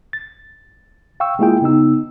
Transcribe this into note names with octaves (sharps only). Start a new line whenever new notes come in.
A6
F5 G5 C#6 E6
G#3 A#3 E4 F4 G#4 G5
C#3 B3 D#4 E6